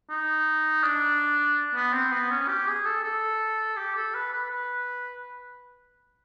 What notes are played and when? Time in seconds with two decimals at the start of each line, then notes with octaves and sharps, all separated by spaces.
0.10 D#4
0.83 D4
1.75 B3
1.93 C4
2.12 B3
2.31 C#4
2.48 G4
2.67 G#4
2.85 A4
3.04 A4
3.77 G4
3.95 A4
4.14 B4
4.33 B4
4.50 B4